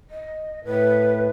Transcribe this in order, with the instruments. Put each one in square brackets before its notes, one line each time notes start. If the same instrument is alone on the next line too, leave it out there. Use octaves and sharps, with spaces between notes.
[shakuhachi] D#5
[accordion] A2 [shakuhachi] B4